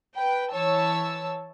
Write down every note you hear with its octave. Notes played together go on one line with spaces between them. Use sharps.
B4 G5
E3 C#5 A5 E6